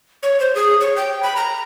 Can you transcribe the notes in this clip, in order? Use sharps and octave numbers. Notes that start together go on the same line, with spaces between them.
C#5
C5
G#4
C#5
G5
B5
A#5